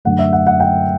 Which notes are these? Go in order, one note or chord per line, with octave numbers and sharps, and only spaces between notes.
F#2 D3 A3 F#5
E5
F#5
F#5
G5